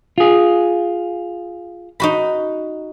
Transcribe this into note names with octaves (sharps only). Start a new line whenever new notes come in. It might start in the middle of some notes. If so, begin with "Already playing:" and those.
F4 G#4
D#4 F#4 B5